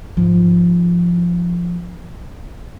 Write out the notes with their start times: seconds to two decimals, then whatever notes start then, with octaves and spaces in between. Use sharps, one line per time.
0.17 G#2 F3